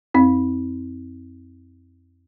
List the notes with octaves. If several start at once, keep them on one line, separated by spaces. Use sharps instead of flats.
F2 C4